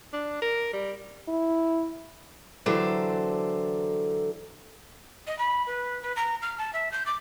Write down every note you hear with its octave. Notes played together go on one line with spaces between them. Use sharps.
D4
A#4
G3
E4
D3 E3 F#3 G4 A4 C5
D#5
B5
B4
B4
A#5
F6
A5
E5
G6
D6